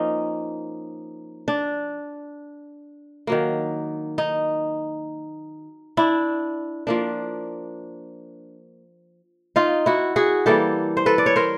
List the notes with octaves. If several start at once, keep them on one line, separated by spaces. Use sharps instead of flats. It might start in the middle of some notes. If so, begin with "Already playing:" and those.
Already playing: F3 A#3 C#4 D#4
D4
D#3 F#3 A#3
D#4
D4 E4
F3 A#3 D4
D#4 F4
E4 F#4
F#4 G#4
E3 G3 A#3 G4 A4
C5
A4 B4
D5
C#5
A#4 C5